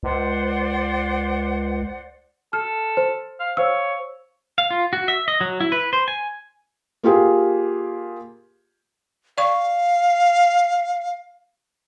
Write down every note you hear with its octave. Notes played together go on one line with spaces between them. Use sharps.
C#2 C5 D5 F#5
A4 F6
C5
F5
C5 C#5 F5 E6
F5
F4
F#4
E5
D#5
F#3
E4
B4
C5
G#5
A#3 F4 G4 G#4
D5 F5 C#6